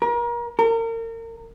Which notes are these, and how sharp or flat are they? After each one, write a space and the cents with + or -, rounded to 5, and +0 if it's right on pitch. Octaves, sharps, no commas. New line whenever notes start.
A#4 +35
A#4 -35